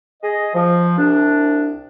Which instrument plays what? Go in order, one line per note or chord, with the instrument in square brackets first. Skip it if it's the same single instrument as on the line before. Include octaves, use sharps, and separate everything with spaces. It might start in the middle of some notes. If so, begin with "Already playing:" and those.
[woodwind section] G#4 D#5
F3
C2 D4